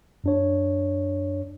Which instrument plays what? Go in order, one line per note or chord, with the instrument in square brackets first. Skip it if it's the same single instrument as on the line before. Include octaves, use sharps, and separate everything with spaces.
[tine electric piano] F#2 D4 C#5